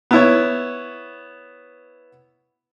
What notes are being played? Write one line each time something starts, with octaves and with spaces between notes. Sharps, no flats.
B3 E4 C#5